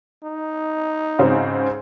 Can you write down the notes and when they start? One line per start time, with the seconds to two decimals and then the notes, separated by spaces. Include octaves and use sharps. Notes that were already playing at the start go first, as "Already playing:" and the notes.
0.23 D#4
1.19 G#2 C#3 C4